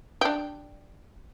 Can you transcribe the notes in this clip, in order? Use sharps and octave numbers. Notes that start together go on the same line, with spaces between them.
D4 G4